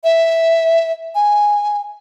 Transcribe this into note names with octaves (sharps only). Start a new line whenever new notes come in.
E5
G#5